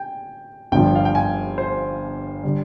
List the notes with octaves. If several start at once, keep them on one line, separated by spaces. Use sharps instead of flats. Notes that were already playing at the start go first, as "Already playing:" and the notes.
Already playing: G5 G#5
G1 G2 F3 G5
F5
G5
G#5
C5
D3 G3